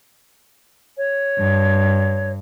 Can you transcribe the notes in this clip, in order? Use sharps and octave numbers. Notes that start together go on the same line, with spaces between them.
C#5
G2